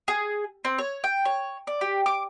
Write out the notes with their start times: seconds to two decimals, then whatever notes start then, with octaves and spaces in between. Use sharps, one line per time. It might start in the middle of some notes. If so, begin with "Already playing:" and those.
0.08 G#4
0.65 C4
0.78 C#5
1.04 G5
1.25 C#5
1.67 D5
1.81 G4
2.06 D6